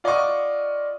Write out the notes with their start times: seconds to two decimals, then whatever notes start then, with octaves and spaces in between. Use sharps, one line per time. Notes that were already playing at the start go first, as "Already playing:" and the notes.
0.04 F4 D5 D#5 F#5 C#6 D#6